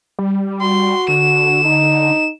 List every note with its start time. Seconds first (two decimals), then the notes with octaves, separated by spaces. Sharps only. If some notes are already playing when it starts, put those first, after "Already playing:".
0.19 G3
0.60 F#4 C6
1.08 D3 E7
1.65 D#4